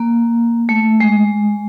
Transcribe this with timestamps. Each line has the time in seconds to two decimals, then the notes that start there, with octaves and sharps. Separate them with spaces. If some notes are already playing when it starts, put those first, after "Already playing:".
Already playing: A#3
0.69 A3
1.00 G#3